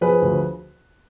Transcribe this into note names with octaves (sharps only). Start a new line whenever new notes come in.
F3 G#4 B4
D2